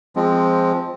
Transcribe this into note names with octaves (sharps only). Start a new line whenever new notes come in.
F3 G#3 C4